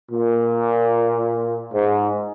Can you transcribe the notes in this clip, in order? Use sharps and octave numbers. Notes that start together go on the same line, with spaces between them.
A#2
G#2